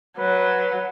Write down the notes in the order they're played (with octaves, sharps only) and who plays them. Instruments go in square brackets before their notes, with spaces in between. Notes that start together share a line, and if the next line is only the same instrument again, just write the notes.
[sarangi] F#3 [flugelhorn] B4